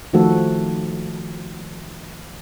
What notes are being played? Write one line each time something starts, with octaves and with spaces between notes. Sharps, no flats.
D#3 F3 A3 F#4 A4